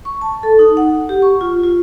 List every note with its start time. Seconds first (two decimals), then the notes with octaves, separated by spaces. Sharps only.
0.05 C#6
0.21 A5
0.43 A4
0.59 D#4
0.77 F#5
1.09 G4
1.22 C#6
1.41 F4
1.63 F4